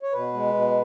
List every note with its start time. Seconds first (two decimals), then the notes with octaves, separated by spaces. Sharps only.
0.03 C#5
0.13 B2 B4
0.33 G#3
0.54 B2